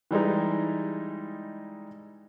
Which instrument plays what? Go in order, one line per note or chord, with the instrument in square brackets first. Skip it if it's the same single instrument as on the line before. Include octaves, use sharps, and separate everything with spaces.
[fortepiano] E3 G3 G#3 D#4